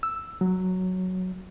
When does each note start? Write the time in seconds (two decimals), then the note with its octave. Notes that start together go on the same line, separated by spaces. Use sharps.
0.03 E6
0.41 F#3